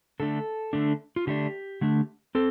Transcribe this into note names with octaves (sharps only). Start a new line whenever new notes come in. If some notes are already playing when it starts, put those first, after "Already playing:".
D3 A3 D4 A4
D3 A3 D4
F4
D3 A3 D4 G4
D3 A3 D4
C4 A4